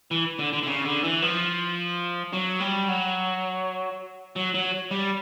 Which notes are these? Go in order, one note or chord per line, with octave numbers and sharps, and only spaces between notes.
E3
D3
D3
D3
C#3
D3
E3
F3
F#3
G3
F#3
F#3
F#3
G3